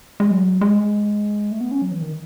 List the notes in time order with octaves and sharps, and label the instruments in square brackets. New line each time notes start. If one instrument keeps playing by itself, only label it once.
[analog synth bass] G#3
F#3
G#3
A3
B3
C#4
F#3
E3
D#3